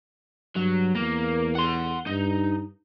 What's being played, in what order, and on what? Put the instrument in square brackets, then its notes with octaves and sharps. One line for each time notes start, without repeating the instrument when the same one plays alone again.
[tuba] G2 [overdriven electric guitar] F#3
[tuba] E2 [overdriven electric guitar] A#3
[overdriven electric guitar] F#5 C6
[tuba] G2 [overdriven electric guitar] D#4